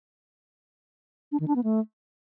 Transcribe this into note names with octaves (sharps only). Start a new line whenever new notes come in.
D4
D#3
D4
B3
A3